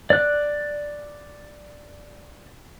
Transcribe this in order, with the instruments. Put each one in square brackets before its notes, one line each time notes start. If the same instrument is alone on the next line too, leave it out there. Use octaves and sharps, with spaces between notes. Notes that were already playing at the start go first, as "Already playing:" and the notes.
[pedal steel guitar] D5 F#6